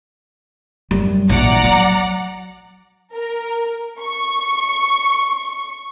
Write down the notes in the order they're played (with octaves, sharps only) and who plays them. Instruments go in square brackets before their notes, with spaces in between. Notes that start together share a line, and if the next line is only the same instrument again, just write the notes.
[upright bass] F#2 G3
[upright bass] A#1 E3 [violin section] D5 F#5 A#5
[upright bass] F#3
[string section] A#4
C#6